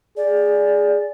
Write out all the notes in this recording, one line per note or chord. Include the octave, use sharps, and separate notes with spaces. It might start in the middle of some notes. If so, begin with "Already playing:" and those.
G#4 D5